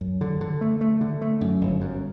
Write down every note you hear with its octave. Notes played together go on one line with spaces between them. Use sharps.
F#2
D3
D3
A3
A3
D3
A3
F#2
G1
F#2